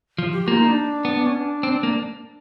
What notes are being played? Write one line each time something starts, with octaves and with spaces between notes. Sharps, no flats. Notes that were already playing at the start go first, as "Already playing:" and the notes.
F3
G4
A#3 F4
D#4
D4
B3
C#4
D4
C4
A#3